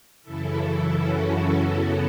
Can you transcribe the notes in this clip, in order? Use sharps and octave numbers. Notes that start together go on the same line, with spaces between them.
F#2 C#3 E3 E4 A4
C#4 F#4
B3 E4